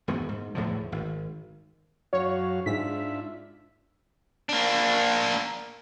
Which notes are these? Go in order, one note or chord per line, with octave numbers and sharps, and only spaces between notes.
E1 D2 G#2 B3
G#2
E2 A2 D3 F3
G#1
F#2 F#4 C#5 F5
G#2 D4 F4 E5 B6
A#3 D4